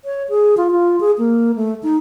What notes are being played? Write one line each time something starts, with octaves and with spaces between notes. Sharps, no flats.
C#5
G#4
F4
F4
G#4
A#3
A3
D#4